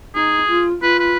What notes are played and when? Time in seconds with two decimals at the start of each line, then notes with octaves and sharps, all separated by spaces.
0.15 D#4 G#4
0.48 F4
0.82 F4 B4
1.00 B4